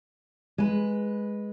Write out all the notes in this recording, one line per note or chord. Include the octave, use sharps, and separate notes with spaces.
G#3 B4